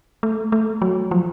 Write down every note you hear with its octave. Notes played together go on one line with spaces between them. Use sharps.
A3
A3
F#3
F3